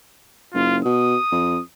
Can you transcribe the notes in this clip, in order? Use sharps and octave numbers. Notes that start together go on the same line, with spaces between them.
F#1 F4
B2 D#6
F2